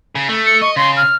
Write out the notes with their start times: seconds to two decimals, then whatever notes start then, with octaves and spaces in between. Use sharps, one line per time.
0.15 C#3
0.29 A3
0.46 C#7
0.62 D#5 C#6
0.76 C#3 C6
0.97 F6